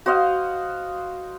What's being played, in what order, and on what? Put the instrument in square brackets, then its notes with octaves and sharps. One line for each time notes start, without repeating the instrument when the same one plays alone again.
[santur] F#4 C5 D#5 F5